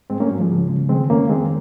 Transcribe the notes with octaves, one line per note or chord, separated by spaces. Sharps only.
G#2 G#3 C4
A#3 C#4
G#2 F#3
F3 G#3
C#3
C#3
D#3 G#3 C4
F2 A#3 C#4
D#3 G#3 C4